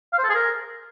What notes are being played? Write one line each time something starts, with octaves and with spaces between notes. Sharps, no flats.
F5
C5
A4
G#4
A#4